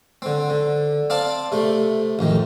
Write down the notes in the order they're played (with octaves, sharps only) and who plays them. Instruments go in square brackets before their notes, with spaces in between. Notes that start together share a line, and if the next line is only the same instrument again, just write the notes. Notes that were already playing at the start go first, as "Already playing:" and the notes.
[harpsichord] D3 C4
D3
C4 D5 F5 A5
C3 A3
A1 F2 D#3